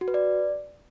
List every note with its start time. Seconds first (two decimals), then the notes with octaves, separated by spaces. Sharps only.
0.01 F#4
0.08 B4
0.14 D5